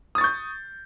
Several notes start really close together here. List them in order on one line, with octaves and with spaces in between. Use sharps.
D#6 A6 C#6 G6